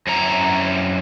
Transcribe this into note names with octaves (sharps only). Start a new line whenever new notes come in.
F#2 C4 C#4 E4 A#5